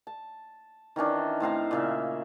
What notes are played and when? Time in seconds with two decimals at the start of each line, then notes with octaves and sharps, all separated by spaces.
0.07 A5
0.96 D#3 E3 C#4 D4
1.40 A2 C4 F5 A#5
1.71 A#2 C#3 E5